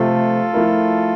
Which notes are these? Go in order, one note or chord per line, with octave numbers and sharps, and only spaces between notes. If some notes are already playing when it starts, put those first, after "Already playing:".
Already playing: C3 F3 A3 C4 F4 A4
F3 A3 E4 A#4